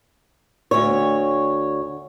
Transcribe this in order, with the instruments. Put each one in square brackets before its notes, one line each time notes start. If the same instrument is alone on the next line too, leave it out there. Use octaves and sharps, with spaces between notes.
[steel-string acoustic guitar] D2 C#5